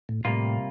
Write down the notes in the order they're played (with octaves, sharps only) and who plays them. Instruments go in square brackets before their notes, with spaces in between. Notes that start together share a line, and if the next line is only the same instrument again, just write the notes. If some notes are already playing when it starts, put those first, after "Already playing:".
[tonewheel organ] A2
[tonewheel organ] A2 [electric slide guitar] C3 G3 A#3 F4